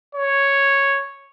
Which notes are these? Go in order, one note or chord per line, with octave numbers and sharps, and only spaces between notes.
C#5